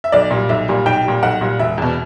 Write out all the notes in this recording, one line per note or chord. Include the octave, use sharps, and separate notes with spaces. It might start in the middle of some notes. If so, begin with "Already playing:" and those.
E5
B1 D5
A#2 G3
B1 E5
A#2 G3
B1 G5
A#2 G3
B1 F#5
A#2 G3
E1 E5
E2 B2